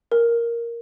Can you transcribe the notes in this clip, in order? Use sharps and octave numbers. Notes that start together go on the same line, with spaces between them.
A#4